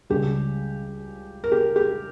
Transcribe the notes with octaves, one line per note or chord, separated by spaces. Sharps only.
C#2 C#3 G3 G4
A#4
G4
G4